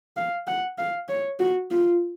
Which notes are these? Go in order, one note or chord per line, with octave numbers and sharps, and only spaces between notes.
F5
F#5
F5
C#5
F#4
F4